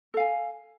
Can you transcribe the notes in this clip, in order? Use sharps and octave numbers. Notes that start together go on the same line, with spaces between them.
A4 F5 G#5